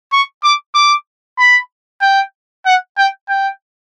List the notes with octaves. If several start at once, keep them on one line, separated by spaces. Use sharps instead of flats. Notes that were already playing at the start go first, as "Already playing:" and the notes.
C#6
D6
D6
B5
G5
F#5
G5
G5